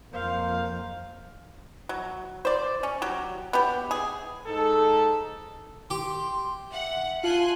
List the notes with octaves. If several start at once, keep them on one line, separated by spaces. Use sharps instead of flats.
F2 F3 A#3 C5 F5 C6 G6
F#3
C5 D5
C#4
F#3 G4
B3 G4
G#4
G#2 D#4 A4
G4 C6
E5 F#5
F4 G#5 A5 C6 F#6